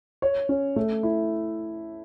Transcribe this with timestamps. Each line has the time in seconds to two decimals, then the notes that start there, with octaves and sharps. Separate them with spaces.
0.22 C#5
0.49 C#4
0.76 A3
1.03 E4